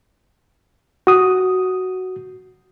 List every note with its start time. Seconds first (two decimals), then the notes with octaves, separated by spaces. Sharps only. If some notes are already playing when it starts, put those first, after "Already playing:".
1.07 F#4 D#6